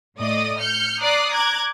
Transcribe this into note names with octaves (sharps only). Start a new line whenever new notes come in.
A2 D5 D#5 D#6
F6 G6 C#7
D5 A#5 D6 D#6 F#6 C7
A#5 D6 F#6 G#6